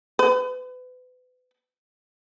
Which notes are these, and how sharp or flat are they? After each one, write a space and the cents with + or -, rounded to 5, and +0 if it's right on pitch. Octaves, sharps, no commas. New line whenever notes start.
B4 +35